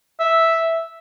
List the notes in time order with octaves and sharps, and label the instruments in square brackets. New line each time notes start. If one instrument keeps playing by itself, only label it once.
[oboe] E5